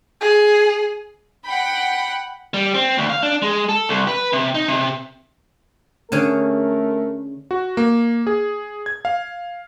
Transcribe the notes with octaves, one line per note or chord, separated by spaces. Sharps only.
G#4
F#5 G5 B5
G3
C4
D2
F5
D4
G#3
A4
C2
B4
C3
D#4
C3
D3 A3 C#4 G#4 A#4
F#4
A#3
G#4
G#6
F5